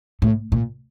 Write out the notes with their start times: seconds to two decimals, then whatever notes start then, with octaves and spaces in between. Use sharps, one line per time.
0.22 A2
0.52 A#2